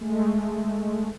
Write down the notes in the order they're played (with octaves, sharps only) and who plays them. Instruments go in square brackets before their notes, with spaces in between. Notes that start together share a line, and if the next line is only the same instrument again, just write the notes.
[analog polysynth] G#3 A3